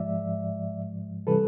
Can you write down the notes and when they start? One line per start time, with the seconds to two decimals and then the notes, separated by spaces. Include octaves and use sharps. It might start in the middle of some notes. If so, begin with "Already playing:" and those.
Already playing: G#2 F3 G#3 D5 E5
1.27 C3 E3 G3 A4 B4